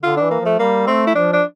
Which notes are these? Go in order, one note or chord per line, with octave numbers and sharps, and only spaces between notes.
D3 F4
D4
E3
A#3
F3 A3
G3 A#3
A3 C4
E4
F3 D4
D4